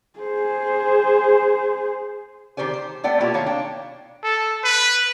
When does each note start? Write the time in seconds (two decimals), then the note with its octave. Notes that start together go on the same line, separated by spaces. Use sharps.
0.19 G#4 C5
2.57 D#3 G4 C5 D5 G#5
2.74 C5
3.03 A3 B3 D5 F#5 G5
3.20 B2 A#3 E4 F4 G4
3.34 D#3 C#5 F5
3.46 D4 G5
4.23 A4
4.64 B4